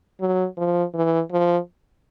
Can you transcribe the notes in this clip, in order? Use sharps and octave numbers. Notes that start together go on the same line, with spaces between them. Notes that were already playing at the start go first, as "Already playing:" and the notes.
F#3
F3
E3
F3